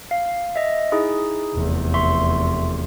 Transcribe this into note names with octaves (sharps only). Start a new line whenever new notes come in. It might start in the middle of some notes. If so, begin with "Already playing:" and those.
F5
D#5 E5
D#4 E4 G#4
F1 E2
E5 C6 C#6